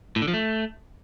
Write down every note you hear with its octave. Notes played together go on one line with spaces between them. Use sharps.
A2
D3
F3
A3